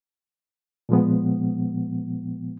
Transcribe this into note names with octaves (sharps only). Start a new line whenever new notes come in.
A#2 F3 G#3 B3